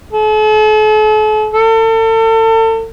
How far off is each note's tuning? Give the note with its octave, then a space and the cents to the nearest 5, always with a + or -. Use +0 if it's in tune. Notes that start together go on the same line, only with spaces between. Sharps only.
A4 -45
A4 +35